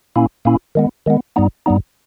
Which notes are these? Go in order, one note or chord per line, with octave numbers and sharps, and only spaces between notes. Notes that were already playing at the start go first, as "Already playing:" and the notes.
A#2 A#3 C#4 E4
A#2 A#3 C#4 E4
D#3 G#3 B3
D#3 G#3 B3
G2 G3 B3 D#4
G2 G3 B3 D#4